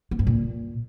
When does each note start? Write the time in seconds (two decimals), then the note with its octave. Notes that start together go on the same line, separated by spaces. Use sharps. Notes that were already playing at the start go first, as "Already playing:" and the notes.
0.11 B3
0.19 G2
0.27 A#2